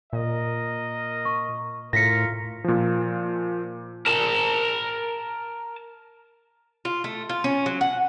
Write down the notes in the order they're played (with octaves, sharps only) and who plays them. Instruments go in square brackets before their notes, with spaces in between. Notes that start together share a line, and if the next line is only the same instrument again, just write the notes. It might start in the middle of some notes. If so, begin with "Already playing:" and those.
[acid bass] A#2 [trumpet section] A#4 D#5
[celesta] C#6
[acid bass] A2 [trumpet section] F4 A#4 [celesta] A#6 B6 C#7
[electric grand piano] A#2 F3
[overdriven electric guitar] A#4 A5
[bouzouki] F4
A3
F4
C#4
F#3
F#5